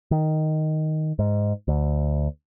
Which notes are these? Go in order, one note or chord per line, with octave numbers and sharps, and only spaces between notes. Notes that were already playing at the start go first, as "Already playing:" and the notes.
D#3
G#2
D2